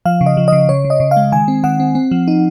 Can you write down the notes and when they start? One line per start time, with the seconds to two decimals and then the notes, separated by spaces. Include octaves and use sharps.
0.05 F3 F5
0.21 C#3
0.26 D#5
0.37 F3
0.48 C#3 D#5
0.69 C#3 C#5
0.85 C#3
0.90 D#5
1.00 C#3
1.11 F5
1.16 G#3
1.32 D#3 G#5
1.48 C4
1.64 D#3 F#5
1.80 C4
1.95 C4
2.11 F3
2.28 D#4